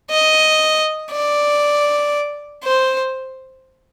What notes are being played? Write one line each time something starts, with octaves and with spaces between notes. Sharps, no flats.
D#5
D5
C5